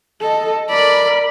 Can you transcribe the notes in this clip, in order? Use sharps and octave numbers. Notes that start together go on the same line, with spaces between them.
A4 D#5
A#4 D5 B5